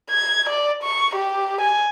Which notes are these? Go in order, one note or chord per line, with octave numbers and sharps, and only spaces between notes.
G#6
D5
C#6
G4
G#5